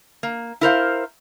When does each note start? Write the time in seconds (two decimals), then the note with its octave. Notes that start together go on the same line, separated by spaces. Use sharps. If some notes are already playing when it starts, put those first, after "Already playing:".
0.23 A#3
0.61 E4 A#4 C5 F5